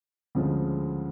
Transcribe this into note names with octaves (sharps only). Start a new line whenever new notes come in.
D2 C#3 F3 G#3